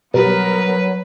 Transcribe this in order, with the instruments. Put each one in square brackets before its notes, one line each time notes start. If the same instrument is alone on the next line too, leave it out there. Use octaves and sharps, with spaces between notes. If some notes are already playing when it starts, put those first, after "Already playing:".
[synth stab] B2 G3 [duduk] F#3 [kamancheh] B3 A#4 [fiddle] B4